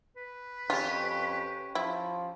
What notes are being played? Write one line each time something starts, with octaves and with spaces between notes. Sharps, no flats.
B4
F2 C#4 F4 G4
F3 E4